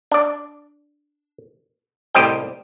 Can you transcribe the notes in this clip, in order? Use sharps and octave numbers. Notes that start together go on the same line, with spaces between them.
D4 D5
C2 A2 G4 C5 D#5 G5